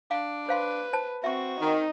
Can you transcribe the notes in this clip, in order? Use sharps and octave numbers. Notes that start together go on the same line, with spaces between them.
D4 F5
B4 C5 F5 C6
C5 A5
C4 F#4 E5 C#6
D#3 D#4